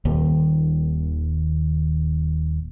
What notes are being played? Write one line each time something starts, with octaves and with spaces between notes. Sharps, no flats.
D#1 D#2